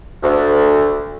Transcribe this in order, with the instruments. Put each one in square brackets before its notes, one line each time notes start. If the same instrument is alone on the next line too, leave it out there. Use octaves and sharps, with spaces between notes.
[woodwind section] D2